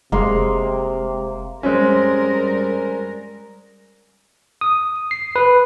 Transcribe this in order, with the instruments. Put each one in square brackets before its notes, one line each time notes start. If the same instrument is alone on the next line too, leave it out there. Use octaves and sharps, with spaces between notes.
[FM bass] F1 [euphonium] C3 [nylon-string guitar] G#3 [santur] A#3 A#4 C6
[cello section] G3 A#4 [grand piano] G#3 C4 C#4
[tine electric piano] D#6
C7
B4